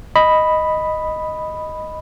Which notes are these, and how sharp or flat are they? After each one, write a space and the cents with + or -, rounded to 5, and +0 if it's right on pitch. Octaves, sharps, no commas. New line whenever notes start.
D#5 +0 B5 +0